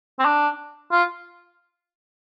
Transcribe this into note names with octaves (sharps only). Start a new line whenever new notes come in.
C4
D4
F4